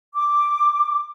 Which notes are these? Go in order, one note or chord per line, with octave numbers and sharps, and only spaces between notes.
D6